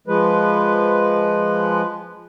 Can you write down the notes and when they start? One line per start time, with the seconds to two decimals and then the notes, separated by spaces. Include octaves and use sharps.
0.08 F3 G#3 B4